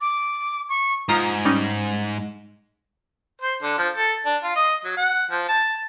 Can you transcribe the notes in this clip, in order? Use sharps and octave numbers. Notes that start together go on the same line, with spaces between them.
D6
C#6
G#2 F4 A#5 D#6
G3 C#4 D#4
C5
D3
F3
A4
D4
F4
D#5
F#3
F#5
F3
A5